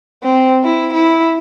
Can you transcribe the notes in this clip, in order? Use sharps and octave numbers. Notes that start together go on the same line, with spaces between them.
C4
E4
E4